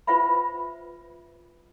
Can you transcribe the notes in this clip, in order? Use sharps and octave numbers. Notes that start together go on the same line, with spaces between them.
F4 B4 C5 E5 F#5 B5